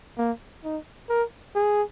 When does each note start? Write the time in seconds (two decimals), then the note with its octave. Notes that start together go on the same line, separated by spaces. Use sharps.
0.18 A#3
0.64 D#4
1.09 A#4
1.55 G#4